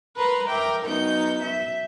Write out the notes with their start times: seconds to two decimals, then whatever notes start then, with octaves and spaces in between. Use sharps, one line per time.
0.16 A#4 B4 A#5 C6
0.47 A#4 E5 G5 D6
0.84 F#2 B3 D#4 G6
1.44 E5